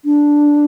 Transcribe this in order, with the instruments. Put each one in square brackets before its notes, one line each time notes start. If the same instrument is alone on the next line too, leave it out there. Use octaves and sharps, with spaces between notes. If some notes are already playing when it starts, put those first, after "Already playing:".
[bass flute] D4